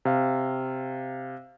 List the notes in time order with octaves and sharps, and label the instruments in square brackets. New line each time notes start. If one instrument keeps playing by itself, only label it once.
[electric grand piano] C3 F5